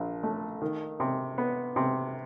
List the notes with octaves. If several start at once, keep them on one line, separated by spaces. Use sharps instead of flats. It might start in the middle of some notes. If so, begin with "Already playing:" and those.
Already playing: A#1
A3
D#3
C3
B3
C3